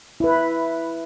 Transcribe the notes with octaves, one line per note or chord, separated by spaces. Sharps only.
E4 B4